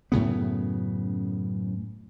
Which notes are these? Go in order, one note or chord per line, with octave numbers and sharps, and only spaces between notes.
F#2 A2 C#3 B3